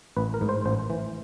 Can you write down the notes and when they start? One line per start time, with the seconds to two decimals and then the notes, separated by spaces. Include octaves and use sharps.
0.17 A1 B4
0.34 A#4
0.41 G#2
0.49 C5
0.66 A1 C5
0.90 E3